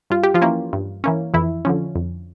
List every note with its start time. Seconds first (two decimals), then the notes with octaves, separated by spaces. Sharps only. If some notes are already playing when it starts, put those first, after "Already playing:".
0.10 G2 F4
0.23 G4
0.34 F3 F4
0.42 E3 A#3 C#4
0.73 G2
1.04 E3 A#3 C#4
1.34 F2 E3 E4
1.65 D3 F3 C#4
1.95 F2